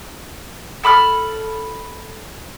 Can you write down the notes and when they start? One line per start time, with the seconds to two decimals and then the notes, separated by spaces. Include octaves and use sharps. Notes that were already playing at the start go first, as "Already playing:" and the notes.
0.84 A4 B5 D6 F6